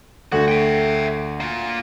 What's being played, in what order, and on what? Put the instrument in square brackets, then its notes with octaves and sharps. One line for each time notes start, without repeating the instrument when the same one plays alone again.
[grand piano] D2 [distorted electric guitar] F#4
[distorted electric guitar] E5 G5
A#3 F4